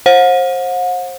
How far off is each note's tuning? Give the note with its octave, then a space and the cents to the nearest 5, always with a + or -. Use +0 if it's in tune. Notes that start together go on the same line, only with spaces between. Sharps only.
C5 +30 F#5 -40